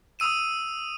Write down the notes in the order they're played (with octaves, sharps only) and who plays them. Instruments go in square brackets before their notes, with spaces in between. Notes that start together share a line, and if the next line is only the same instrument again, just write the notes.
[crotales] D#6 E6 D#7 E7